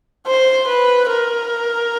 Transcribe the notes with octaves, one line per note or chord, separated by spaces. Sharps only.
C5
B4
A#4